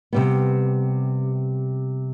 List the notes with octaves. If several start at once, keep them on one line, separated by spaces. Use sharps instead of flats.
C3 G3 B3